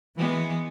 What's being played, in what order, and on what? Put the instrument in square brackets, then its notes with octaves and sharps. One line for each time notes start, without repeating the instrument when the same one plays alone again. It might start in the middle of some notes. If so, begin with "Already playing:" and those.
[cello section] E3 [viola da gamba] G#3 B3